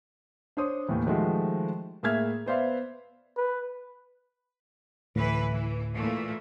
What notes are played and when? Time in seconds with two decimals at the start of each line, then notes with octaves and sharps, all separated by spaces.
0.57 D4 C5 C#5 D#6
0.88 D#2 A2 E3
1.06 D#3 F3 G#3 A3 F#4 G4
2.03 A2 A#3 G#4 E5 F6 G#6
2.46 B3 B4 C5 D5 E5 F5
3.37 B4
5.16 D2 A2 E3 B4
5.52 E3
5.95 A#2 E3 A3